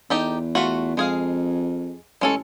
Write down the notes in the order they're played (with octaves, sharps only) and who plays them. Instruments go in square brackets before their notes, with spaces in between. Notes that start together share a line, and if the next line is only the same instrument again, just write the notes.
[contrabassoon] E2 [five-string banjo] D#4 G4 A4
[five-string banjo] A3 F4 F#4
[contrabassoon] F2 [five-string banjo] G#3 G#4 F5
[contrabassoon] A1 [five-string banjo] G#3 C#4 A4